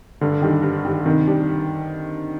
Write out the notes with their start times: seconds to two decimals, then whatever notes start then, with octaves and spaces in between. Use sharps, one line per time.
0.21 G2 D3
0.42 D#3 G3
0.63 G2
0.85 D#3 G3
1.05 C3 D#3
1.27 G3 D4